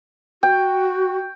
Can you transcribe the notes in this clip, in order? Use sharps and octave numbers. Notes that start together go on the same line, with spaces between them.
F#4 G5